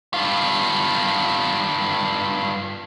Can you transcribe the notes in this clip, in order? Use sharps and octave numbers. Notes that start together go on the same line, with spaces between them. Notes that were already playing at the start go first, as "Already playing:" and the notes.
G2 F4